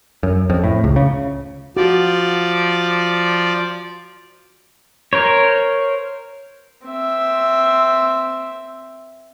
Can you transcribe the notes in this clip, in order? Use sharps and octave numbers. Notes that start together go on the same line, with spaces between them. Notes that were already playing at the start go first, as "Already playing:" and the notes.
F#2
F2
A2
C#2
C#3
F3 F#4 D5
A#4 C5 C#5
C4 E5